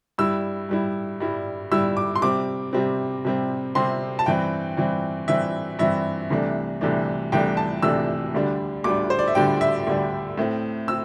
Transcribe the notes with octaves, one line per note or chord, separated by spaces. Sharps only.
G2 G3 E4 E6
G2 G3 E4
G2 G3 E4
G2 G3 E4 E6
D6
C6
C3 G3 C4 D6
C3 G3 C4
C3 G3 C4
C3 G3 C4 C6
A5
G2 E3 C4 G5
G2 E3 C4
G2 E3 C4 E5
G2 E3 C4 E5
C2 C3 E3 A3 D4
C2 C3 E3 A3 D4
C2 C3 E3 A3 D4 G5
A5
C2 C3 E3 A3 D4 E6
D2 D3 G3 D4
D2 D3 G3 D4 D6
C5
D5
E5
D2 D3 G3 D4 G5
E5
D2 D3 G3 D4
A2 A3 C4
C4 E6